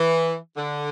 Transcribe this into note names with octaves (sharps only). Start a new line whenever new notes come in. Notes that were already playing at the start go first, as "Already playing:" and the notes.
Already playing: E3
D3